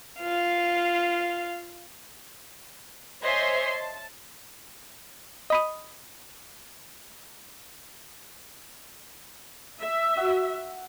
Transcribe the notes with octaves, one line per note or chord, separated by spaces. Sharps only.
F4 F5
C5 C#5 D#5 E5 G#5 C6
A5
D#5 B5 D#6
E5
F#4 F#5